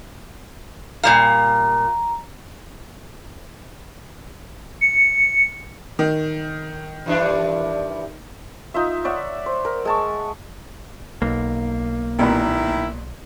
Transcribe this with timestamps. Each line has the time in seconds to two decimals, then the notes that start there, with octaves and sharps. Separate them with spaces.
1.04 A#2 G3 F5 A#5
4.81 C#7
5.99 D#3
7.06 G2 E3 D4
8.74 D#4 F4 E5
9.04 C#5 D5 E5 F#5
9.46 C5
9.65 A#4
9.85 G#3 A5 C#6
11.22 B1 A#3
12.19 A1 A#2 D#3 B3 E4